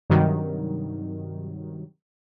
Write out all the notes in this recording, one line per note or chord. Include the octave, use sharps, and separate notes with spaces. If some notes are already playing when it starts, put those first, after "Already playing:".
G2 C3 D#3 F#3 G3